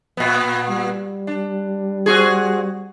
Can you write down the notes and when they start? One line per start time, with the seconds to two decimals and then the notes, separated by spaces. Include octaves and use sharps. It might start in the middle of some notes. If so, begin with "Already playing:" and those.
0.17 A#2 B3
0.70 G3
1.27 D4
2.06 C4 F#4 G#4